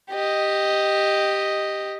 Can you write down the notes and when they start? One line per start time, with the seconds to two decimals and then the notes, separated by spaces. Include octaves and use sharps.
0.10 G4 D#5